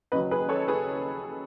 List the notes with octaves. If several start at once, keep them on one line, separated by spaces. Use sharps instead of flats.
D#2 C#3 F#3 B4 D#5
G#4 B4
A4 C#5
G#4 B4